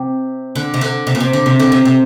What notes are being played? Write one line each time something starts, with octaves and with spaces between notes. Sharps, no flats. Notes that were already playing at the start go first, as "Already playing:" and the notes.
Already playing: C3
D3
C3
D3
C3
A#2
C3
D3
C3
D3
C3
C3